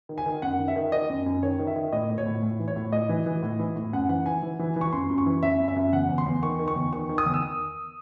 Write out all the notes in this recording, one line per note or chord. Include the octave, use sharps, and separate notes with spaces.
D#3
G#5
D#3
F#2 F#5
D#3
E5
D#3
D#3 D#5
F#2
F#2
D#3 C#5
D#3
E5
D#3
A2 D#5
A2
C#5
A2
A2
E3
C#5
A2
A2 D#5
E3
E3
A2
E3
A2
F#2 F#5
E3 F#5
E3 G#5
E3
E3
E3
C#6
F#2 C6
F#2
C#6
E3
F#2 E5
F#2
E5
F#2
E2 F#5
E2
C6
E2
D#3 C#6
D#3
C#6
E2
D#3 C#6
D#3
D#6
E2
E6